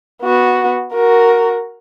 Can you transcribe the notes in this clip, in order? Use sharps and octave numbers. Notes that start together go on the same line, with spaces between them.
B3 F#4
F#4 A#4